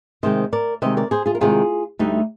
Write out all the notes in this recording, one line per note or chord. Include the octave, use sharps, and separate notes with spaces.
C3 D#3 G#3 C5 D#5
A#4 D5
C3 D#3 G#3 C5 D#5
A#4 D5
G#4 C5
F4 G#4
A#4
C3 D#3 G#3 F4 G#4
D2 D3 G3 D#4